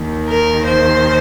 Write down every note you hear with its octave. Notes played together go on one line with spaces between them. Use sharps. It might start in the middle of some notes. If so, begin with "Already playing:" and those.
Already playing: D#2 D#3
A#4
C5